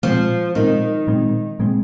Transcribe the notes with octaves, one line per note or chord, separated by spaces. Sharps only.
A#2 F3 G#3 C4
A#2 D#3 G#3 C4
A#2 G#3 C4
A#2 G#3 C4